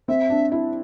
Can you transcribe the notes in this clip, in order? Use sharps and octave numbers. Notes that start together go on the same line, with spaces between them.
C4 E5
D4
E4